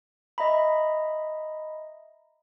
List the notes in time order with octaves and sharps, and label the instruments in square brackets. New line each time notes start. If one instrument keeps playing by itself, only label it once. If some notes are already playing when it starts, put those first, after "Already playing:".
[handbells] D#5 E5 A#5 B5